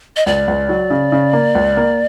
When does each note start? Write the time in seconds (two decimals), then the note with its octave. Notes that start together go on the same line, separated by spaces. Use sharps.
0.16 D#5
0.26 C#2 D5
0.48 C#2
0.69 F#3
0.90 C#3
1.12 C#3
1.33 A#3
1.55 C#2
1.77 A#3